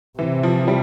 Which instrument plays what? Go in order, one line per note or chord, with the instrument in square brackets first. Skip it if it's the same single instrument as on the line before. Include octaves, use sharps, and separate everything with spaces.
[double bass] C3 [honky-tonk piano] E3
[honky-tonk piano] F3
G3